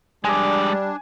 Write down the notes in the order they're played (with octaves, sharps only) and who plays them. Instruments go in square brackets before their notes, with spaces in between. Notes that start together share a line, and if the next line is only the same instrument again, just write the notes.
[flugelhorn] G3 [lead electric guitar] G#3 D5 [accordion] D4 [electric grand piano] G#5